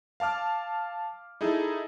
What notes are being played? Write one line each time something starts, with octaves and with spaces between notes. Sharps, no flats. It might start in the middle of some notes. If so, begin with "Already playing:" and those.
F5 A5 D6 F6
D#4 E4 G#4 A4